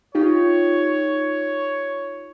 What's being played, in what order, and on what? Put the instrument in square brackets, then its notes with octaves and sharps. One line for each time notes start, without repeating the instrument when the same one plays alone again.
[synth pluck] D#4 F4 G4 [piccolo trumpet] C#5